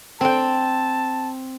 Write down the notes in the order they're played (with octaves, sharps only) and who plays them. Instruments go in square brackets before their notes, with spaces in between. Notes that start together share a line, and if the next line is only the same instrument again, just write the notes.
[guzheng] C4 G5 [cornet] A5